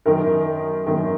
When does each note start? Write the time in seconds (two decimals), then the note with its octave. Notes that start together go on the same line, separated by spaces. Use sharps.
0.06 F#2 D#3 A#4
0.87 F#2 D#3